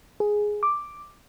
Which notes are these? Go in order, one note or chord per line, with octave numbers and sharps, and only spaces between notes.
G#4
D6